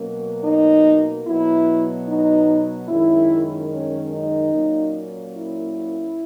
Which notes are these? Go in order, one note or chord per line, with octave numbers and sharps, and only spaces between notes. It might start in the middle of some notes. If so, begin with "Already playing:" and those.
Already playing: B2 F#3 A#3 C#4
D#4
B2 F#3 B3 E4
D#4
F#2 D#3 G#3 C#4 E4
C#4
D#4
A#2 F#3 A#3 C#4
E4